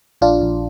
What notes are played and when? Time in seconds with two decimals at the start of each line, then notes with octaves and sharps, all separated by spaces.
0.21 A#1 D4 F4
0.42 A#1